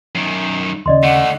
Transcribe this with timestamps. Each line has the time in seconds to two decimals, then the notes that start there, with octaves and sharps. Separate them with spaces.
0.15 F#2 D#3
0.86 D#2 C#3 D5 D#5 C6
1.03 D3 A3 F#5